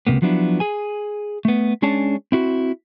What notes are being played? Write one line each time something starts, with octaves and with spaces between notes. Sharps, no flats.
C#2 G2 C3 A#3 B3
F3 F#3 B3 D4 E4
G#4 G#5
A3 B3
G#3 C#4 D4 G#4 C#5 A5
C4 E4 F#4